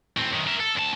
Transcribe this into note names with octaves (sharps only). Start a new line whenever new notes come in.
A2 C4
F#2 D#3
A#4 E5
A4
D2 A5